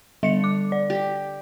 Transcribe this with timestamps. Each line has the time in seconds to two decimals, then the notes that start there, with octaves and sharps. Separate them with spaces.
0.23 D3 G3 C#7
0.44 D6
0.72 D5
0.90 G4